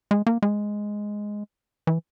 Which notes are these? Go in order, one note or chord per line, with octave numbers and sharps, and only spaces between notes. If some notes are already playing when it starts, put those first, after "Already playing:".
G#3
A#3
G#3
E3